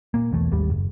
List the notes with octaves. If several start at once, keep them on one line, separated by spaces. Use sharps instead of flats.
A#2 A#3
B1 E2 E3 A3
G#1 D#2 G3
F#1